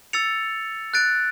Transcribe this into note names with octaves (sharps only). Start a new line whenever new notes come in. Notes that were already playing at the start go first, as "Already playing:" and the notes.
E6 A6 C#7 F7
F#6 A6 D7